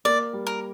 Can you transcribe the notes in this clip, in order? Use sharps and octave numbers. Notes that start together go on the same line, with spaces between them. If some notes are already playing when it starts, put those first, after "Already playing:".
A#3 D5
G3
A#4